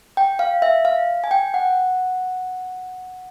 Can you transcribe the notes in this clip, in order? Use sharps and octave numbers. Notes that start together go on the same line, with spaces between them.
G5
F5
E5
F5
G#5
G5
F#5